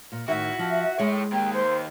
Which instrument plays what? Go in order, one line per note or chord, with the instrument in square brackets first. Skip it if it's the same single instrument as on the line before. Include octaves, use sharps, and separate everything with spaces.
[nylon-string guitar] A#2
[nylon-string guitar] A2 D#3 [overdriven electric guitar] F#4 [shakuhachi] E5
[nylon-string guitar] F3
[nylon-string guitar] G#3 [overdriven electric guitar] E4 C#5
[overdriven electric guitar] D#3 A#3 [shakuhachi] G5
[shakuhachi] C5